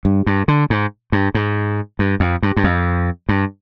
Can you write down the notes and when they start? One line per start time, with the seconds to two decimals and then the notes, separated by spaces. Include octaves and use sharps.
0.05 G2
0.27 G2
0.48 D3
0.70 G#2
1.12 G2
1.35 G#2
1.99 G2
2.20 F2
2.43 G2
2.57 G2
2.64 F2
3.29 G2